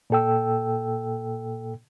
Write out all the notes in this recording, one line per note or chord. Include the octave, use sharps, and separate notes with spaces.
A#2 A#3 A4 G5 E6